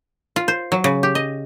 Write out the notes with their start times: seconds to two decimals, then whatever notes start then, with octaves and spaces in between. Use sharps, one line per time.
0.36 F4
0.48 C5
0.72 F#3
0.84 C#3
1.03 G4
1.15 D#5